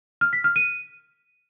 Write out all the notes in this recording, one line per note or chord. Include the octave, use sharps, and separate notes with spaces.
F6
B6
F6
D#7